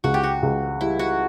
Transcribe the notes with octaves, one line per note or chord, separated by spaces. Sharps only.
C#2 F#4
G4
F#4
C#2
G3 E4
F#4